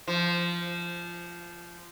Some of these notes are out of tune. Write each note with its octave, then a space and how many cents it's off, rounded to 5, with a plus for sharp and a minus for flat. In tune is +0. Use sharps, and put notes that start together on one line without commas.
F3 -15